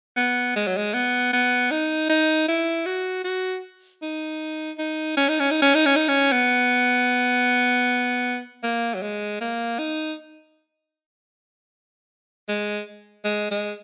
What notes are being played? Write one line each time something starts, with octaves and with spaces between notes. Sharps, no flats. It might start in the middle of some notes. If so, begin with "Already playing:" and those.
B3
G#3
F#3
G#3
B3
B3
D#4
D#4
E4
F#4
F#4
D#4
D#4
C#4
D#4
C#4
D#4
C#4
D#4
C#4
D#4
C#4
B3
A#3
F#3
G#3
A#3
D#4
G#3
G#3
G#3